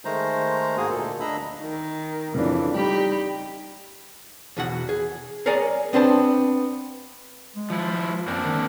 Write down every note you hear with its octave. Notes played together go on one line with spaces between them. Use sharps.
D#3 G#3 A3 C5 A#5
G#2 A#3 F#4 G#4 D#6
D2 A#2 A#3 A4
D2 D4 D#5 A#5 B5 E6
D#3
F2 C#3 E3 D4
G3 D#4 G4 B5
E2 B2 F#4 F#5
G#4
G#4 A#4 C#5 D5 G#5
B3 C4 D4 C5 A5
G#3
F3 E4
F#2 A#3 C4 D4
D#3